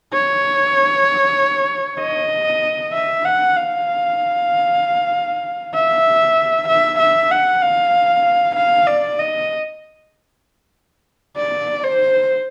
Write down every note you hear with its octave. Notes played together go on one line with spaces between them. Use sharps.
C#5
D#5
E5
F#5
F5
E5
E5
E5
F#5
F5
F5
D5
D#5
D5
C5